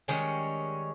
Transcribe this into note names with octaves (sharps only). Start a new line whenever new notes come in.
D#3 G3 G#3 C#4